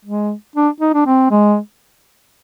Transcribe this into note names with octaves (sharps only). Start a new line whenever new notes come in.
G#3
D4
D#4
D4
C4
G#3